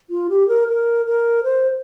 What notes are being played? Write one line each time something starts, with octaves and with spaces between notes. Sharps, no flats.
F4
G4
A#4
A#4
A#4
C5